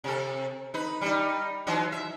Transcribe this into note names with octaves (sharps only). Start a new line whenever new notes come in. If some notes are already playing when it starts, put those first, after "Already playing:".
C3 A4
D#4 B4
G3 D#4
E3 F#3 D#4
E5